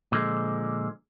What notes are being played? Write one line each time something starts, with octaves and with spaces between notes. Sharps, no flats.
A#2 D3 F3 G#3